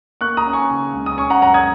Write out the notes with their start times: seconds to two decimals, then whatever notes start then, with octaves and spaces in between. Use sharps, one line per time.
0.21 A#3 C#6 F#6
0.37 A#5 D#6
0.45 C#4
0.53 G#5 C#6
0.70 C#3
0.93 C#2
1.06 D#6
1.17 C#4 G#5 C#6
1.30 F#5 A#5
1.42 F#2 F#5 A#5
1.54 D#6 G#6